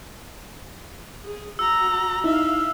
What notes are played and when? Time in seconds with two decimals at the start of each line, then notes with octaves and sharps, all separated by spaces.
1.24 G#4
1.59 F#4 A#5 E6
2.24 D#4 E4 E5 F5